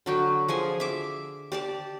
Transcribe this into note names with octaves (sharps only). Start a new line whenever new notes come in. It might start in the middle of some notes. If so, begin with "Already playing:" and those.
D3 F#3 G5
F3 G#4 G#5 C6
E5 D6
G4 D5 A5